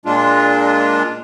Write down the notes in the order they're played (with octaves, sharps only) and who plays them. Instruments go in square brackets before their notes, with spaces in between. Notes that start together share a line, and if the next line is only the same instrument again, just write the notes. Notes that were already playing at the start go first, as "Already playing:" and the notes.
[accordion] A#2 G#3 D4 F4